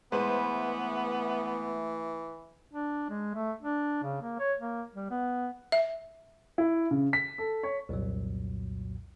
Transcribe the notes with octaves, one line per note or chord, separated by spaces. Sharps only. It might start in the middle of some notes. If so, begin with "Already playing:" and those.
E3 G#3 A3 B3 B4 C5
D4
G#3
A3
D4
C#3
A#3
C#5
A#3
G3
B3
E5
E4
C#3
B6
A4
C#5
C2 F2 A#2 F#3